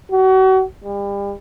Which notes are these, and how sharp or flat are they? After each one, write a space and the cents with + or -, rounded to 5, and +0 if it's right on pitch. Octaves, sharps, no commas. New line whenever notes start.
F#4 +35
G3 +35